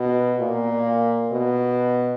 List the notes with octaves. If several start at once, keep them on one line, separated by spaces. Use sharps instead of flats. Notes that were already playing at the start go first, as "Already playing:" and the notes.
Already playing: B2
A#2
B2